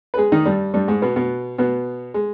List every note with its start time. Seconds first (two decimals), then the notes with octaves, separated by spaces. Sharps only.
0.14 B4
0.17 G#3 G#4
0.32 D#3 D#4
0.45 G2 G3
0.74 G2 G3
0.88 G#2 G#3
1.02 B2 B3
1.16 B2 B3
1.58 B2 B3
2.14 G#3